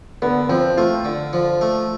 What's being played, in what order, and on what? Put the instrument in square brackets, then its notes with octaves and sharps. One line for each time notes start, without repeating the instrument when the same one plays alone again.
[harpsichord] D3 [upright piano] B3
[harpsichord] F3 [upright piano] C4
[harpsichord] A3 [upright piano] F4
[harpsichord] D3
F3
A3